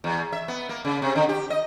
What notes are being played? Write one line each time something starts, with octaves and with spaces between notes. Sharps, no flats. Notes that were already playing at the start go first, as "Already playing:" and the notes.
E2
E5
B3
A#3
C#3
C3
D3
G4
D#5